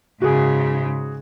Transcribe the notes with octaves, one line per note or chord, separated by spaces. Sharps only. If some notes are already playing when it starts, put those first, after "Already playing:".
G#2 C#3 F#4 G#4